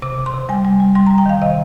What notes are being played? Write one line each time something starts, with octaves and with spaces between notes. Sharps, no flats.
C3 D6
C3
C6
C3
G3 G#5
G3
G3
G3 C6
A#5
G3
G5
D#3 F5
C3 D#5